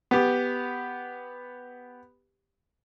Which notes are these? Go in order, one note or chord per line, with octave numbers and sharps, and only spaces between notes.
B3 G4